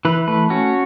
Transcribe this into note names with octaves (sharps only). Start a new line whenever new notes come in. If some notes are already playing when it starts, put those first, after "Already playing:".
E3 B4
A3 B4
C#4 F#4